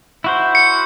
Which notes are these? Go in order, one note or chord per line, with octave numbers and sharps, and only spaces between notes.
E4 F#4 C5
C#7